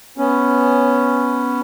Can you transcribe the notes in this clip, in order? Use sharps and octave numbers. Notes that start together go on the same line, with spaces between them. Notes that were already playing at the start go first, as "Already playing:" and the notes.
B3 C#4